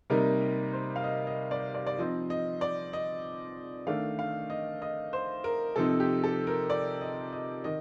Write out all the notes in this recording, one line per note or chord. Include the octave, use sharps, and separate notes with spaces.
C3 G3 A#3 D#4 A#4
C5
F5
D#5
D#5
D5
D5
D5
F3 C4 D#4 D#5
D#5
D5
D#5
D#3 A3 D4 F5
F5
D#5
D#5
C5
A#4
C3 F3 C4 D#4 A4
G4
A4
A#4
D5
D#5
D#5
D#3 D#5